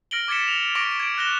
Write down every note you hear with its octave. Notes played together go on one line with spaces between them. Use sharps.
F6 A#6 D7 F#7 G7
D6 G#6 A6 B6 C#7 E7
F7
C#6 D6 A#6 D7 G7
G#6 D7
F#6 A#6 E7 G7